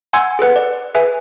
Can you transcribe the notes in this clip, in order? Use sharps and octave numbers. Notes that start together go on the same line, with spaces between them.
F#5 G#5 C6 E6 G6 G#6
G#4 A4 B4 F#5
D5
G#4 B4 E5 G#5